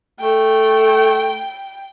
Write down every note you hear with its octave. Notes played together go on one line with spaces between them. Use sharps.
A3 G5